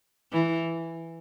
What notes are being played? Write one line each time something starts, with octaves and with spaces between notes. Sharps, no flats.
E3